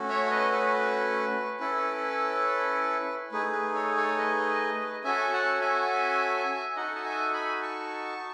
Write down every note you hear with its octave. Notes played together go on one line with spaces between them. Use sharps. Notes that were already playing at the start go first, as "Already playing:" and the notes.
Already playing: A3 C#4 F#4
C#5 E5
C#5
B4 D#5
B4
C#4 E4 A4 B4
A3 D#4 G#4 B4
B4
A4 C#5
A4 C#5
B4 D#5
C#4 F#4 A4 E5 G#5
F#5 A5
E5 G#5
D#4 F#4 A4 D#5 F#5
A5
E5 G#5
G#5 B5
A5 C#6